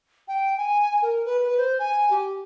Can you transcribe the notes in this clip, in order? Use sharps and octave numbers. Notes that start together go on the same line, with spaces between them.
G5
G#5
A#4
B4
B4
C5
G#5
G4